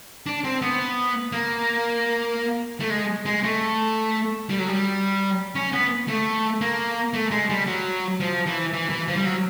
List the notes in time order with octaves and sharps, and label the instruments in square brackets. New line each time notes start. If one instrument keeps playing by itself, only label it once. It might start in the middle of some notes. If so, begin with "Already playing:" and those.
[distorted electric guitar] D4
C4
B3
A#3
A3
G#3
G#3
A3
G3
F#3
G3
C#4
B3
A3
A#3
A3
G#3
G3
F#3
F3
E3
E3
E3
F3
G3
F#3